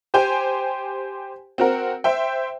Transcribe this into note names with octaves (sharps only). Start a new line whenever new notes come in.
G4 C5 G5 G#5
C4 F#4 A#4
C5 E5 G5